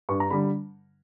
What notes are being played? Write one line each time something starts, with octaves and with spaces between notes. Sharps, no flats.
G2 C#6
A#5
D3 G3 B5